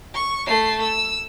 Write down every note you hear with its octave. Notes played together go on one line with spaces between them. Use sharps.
C#6
A3 C7
E6